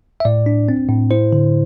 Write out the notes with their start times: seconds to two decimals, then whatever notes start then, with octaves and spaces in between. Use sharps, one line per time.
0.20 E5
0.25 A2 D5
0.46 D4
0.69 C4
0.89 A2
1.11 E4 C5
1.33 D3